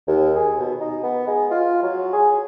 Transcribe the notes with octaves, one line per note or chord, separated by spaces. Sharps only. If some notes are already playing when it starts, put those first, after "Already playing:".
D#2
G#4
B2
D#4
B3
G#3
F4
F#3
G#4